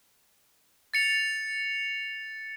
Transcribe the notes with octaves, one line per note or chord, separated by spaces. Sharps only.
A6 C#7 F7